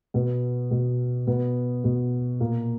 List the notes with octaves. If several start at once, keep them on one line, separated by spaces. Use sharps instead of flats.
B2 B3
B2
B2 B3
B2
A#2 A#3